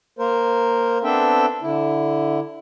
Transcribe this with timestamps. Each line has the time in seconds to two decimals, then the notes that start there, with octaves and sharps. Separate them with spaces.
0.19 A#3 A#4 C5
1.04 B3 C4 D4 A4 E5 G5
1.62 D3 E4